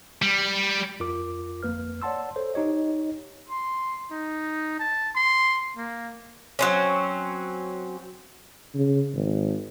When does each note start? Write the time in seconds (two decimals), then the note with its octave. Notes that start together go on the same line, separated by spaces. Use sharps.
0.22 G3
1.00 F2 F4 A#4 D6
1.63 G1 F2 A#3 B4 F6
2.02 C#5 D5 F#5 A5 C6 E6
2.36 A4 C5 C#5
2.54 D#4 G4 C#5 D#5
3.49 C6
4.11 D#4
4.79 A5
5.15 C6
5.77 A#3
6.59 F#3 C4 C#4
8.74 C#3
9.14 G#1